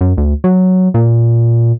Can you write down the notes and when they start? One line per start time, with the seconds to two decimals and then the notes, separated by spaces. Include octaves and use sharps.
0.01 F#2
0.18 D2
0.44 F#3
0.94 A#2